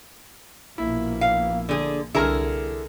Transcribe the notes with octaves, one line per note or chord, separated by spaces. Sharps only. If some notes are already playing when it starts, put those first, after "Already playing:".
A#1 B2 A#3 E4
F5
D3 G#4
C2 D3 E4 G#4 A#4 F6